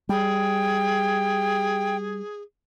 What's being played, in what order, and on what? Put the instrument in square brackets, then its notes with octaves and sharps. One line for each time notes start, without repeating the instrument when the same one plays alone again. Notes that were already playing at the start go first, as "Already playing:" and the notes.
[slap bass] G3 [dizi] G#4 [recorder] G5